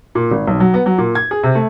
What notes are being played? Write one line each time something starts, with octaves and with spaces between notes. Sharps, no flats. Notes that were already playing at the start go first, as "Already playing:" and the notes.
A#2
G#1
B1
F#3
B3
F#3
A#2
G#6
G#4
C3
A3